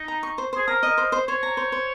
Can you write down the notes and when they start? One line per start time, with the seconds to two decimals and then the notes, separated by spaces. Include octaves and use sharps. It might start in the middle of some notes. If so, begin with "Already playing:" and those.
Already playing: D#4
0.08 A#5
0.23 C#6
0.38 C5
0.53 G#4 C5
0.67 A#4 A#5
0.83 D#5
0.98 C5
1.12 C5
1.28 C5 C#5
1.43 A#5
1.57 C5
1.72 C5